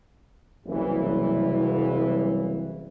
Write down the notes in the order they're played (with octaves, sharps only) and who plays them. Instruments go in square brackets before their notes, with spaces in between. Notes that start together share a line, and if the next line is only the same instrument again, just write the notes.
[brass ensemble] F#1 C2 E3